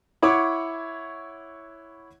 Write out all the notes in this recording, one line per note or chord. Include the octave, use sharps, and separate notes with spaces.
E4 C#5 F#5 C#6 D6